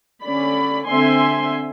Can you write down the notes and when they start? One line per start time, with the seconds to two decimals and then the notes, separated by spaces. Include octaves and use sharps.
0.23 D3 C#4 D5 B5
0.88 D3 C4 E5 G#5 C6